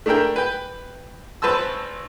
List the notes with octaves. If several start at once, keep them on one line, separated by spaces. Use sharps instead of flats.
A3 D4 E4 A#4 G5
B4 G5
G#1 B4 C5 A5 E6